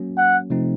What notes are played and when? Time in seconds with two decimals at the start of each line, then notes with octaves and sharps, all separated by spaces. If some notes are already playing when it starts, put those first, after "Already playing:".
Already playing: F#3 A#3 C#4 F#4
0.17 F#5
0.50 C3 F3 A3 C4 D#4